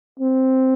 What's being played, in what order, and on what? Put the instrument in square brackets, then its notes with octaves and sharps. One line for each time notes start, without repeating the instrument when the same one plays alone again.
[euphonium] C4